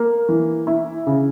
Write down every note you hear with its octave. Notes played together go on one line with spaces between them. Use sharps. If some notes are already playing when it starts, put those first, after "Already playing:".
Already playing: A#3
E3
E4
C#3